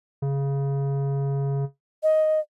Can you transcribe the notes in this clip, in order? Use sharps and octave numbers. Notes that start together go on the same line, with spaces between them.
C#3
D#5